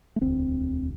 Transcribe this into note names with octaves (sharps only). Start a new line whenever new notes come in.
A3
E1 D2 D3 C4